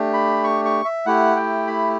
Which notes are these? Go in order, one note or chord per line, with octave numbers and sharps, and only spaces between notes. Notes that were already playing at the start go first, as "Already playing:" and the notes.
Already playing: A3 D4 G4
B5
C#6
C#6
E5
A3 E4 G4 F#5
G5
B5